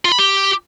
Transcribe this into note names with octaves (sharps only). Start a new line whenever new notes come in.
F4
B5
G4